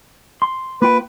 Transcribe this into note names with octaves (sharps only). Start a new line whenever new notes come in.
C6
A#3 F4 B4 G5